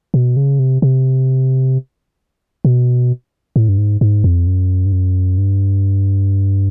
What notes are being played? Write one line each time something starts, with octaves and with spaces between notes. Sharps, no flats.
B2
C#3
C3
C3
B2
A2
G2
G#2
G#2
F2
F#2
G2
F#2
G2